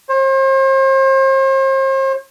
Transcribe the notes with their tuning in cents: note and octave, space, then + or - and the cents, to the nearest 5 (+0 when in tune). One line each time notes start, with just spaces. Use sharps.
C5 +40